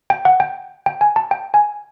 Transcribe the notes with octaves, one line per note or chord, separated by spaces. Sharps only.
G5
F#5
G5
G5
G#5
A5
G5
G#5